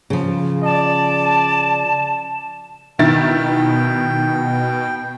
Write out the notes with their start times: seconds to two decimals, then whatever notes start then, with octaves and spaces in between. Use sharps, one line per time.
0.10 C#3 F3
0.64 D5 A5
2.99 B2 D#3 E4 G5 A6